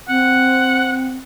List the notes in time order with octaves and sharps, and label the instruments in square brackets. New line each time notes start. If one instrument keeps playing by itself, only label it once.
[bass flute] C4 [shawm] F#5